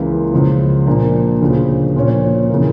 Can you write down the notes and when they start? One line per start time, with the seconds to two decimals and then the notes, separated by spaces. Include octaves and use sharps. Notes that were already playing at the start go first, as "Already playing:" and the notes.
Already playing: C#2 C#3 E3 A#3
0.32 C#2 C#3 F3
0.86 A#2 F3 A#3 D4
1.41 D2 C#3 F3
1.96 A#2 F3 C#4
2.50 C#3 E3 A#3